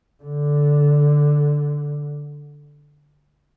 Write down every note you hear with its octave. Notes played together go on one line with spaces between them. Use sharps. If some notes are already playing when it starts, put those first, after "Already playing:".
D3